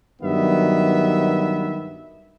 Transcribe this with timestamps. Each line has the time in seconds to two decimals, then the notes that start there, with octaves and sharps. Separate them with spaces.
0.22 G2 D#3 F#3 B3 E5